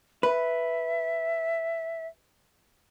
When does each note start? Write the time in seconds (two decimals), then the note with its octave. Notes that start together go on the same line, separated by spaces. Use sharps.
0.23 B4 E5